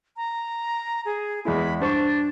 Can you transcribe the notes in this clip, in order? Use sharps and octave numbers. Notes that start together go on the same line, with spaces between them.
A#5
G#4
E2 G#3 E4 B5
G2 D4 C5 C#6